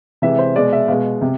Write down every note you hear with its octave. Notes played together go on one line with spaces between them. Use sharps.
C3 E3 G#3 E5
C5
B2 G#3 D5
E5
B2 G#3 F5
C3